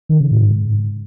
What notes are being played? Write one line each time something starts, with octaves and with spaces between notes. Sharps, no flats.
D#3
C#3
A2
G#2